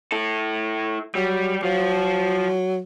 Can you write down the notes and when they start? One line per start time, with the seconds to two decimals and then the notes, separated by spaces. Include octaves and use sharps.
0.12 E4 A4
1.15 F#3 G3
1.63 F3 F#3 F4